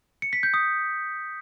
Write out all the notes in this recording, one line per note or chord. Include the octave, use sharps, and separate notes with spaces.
C#7
B6
G6
D#6